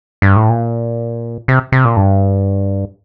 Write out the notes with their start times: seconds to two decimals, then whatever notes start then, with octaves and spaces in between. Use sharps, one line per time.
0.22 G2
0.36 A2
0.50 A#2
1.48 C3
1.72 C3
1.85 A#2
1.97 G2